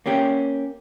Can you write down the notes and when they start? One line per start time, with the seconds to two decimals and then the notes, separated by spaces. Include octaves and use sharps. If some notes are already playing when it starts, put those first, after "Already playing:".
0.06 A#3 C#4 G4